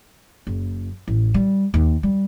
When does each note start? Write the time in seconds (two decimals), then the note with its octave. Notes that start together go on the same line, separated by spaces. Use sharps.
0.47 F#1
1.08 A1
1.34 G3
1.74 D#2
2.03 G3